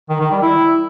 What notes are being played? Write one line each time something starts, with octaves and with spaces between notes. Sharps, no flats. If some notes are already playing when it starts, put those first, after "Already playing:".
D#3
D#3
G3
E4